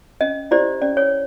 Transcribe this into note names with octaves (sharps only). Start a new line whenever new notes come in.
C#4 D#5
E4 G4 C5 D5
C#4 D5
C#5